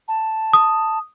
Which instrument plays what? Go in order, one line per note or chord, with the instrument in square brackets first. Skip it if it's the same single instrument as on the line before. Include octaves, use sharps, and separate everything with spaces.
[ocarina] A5
[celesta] D#6